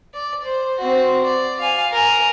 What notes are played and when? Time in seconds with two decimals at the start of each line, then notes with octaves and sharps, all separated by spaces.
0.13 D5
0.44 C5
0.79 C4 F#4
1.24 D5
1.60 F5 G#5
1.92 A#4 G#5